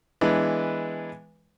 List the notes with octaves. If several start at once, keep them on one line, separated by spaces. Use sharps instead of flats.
E3 G#3 B3 D4 B4